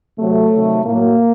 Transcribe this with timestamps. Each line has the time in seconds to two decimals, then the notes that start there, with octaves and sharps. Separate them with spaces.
0.18 C3 F#3 A3
0.52 C3 D#3 F#3
0.85 A2 A#3
0.91 F#3